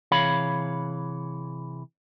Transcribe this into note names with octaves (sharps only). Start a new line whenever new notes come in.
C3 E3 G#4 C#5 F5 B5